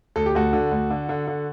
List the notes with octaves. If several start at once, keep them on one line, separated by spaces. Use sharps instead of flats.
D2 A4
G4
D2 F#4 A4
D3
D2
D3
D3
D3